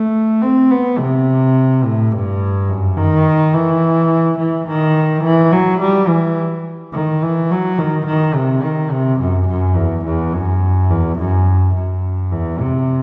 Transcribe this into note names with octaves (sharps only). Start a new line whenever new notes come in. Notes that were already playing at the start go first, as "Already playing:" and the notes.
Already playing: A3
C4
B3
C3
A2
G2
F#2
D#3
E3
E3
D#3
E3
F#3
G3
E3
D#3
E3
F#3
D#3
D#3
C3
D#3
C3
F#2
F#2
E2
E2
F#2
E2
F#2
F#2
E2
C3